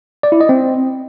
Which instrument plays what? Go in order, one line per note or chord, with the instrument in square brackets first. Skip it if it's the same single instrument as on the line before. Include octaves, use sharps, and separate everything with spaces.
[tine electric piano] D5
E4
D#5
C4